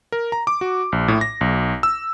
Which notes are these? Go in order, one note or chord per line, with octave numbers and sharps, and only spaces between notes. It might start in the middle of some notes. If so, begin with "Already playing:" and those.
A#4
A#5
D6
F#4
A#1
A2
A#6
B1
E6